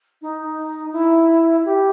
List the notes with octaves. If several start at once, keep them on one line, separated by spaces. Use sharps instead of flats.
D#4
E4
G4